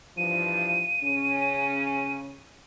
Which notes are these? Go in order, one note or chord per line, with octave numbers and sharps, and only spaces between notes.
G2 E3 F3 D#7
C#3 C#4